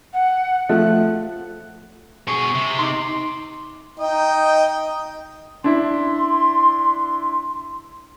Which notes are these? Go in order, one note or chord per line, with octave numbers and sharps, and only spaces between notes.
F#5
F3 A3 F#6
B2 G#4 C#6
C3
D#4 C6 D6
D#4 D#5 G5
D4 E4 C6